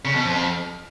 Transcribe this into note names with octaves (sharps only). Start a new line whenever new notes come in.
C#3
B2
F2